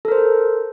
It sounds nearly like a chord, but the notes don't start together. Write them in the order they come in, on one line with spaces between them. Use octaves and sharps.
A4 A#4 C5